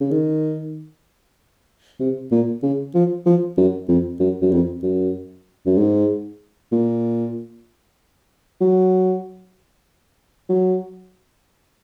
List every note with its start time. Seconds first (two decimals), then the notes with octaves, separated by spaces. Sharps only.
0.01 C#3
0.11 D#3
2.00 C3
2.32 A#2
2.63 C#3
2.95 F3
3.26 F3
3.57 F#2
3.89 F2
4.20 F#2
4.42 F#2
4.51 F2
4.83 F#2
5.66 F#2
5.78 G#2
6.72 A#2
8.61 F#3
10.49 F#3